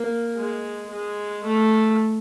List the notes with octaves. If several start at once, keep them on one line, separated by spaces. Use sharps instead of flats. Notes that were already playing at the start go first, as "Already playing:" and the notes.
Already playing: A#3
G#3
G#3
A3